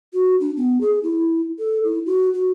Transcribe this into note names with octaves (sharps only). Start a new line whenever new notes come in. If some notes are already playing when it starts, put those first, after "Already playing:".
F#4
D4
B3
G#4
E4
A4
E4
F#4
F#4